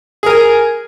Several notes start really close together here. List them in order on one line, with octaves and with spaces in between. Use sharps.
G#4 A#4 G#5